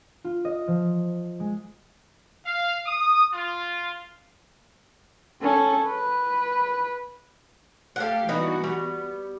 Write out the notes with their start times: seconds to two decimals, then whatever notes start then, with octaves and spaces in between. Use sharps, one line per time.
0.24 F4
0.45 D#5
0.68 F3
1.40 G#3
2.45 F5
2.86 D#6
3.33 F4
5.41 C#4 A4
5.87 B4
7.96 A3 G4 A4 F5 F#5
8.29 E3 G3 B3 D#4 F#4
8.64 G3 B3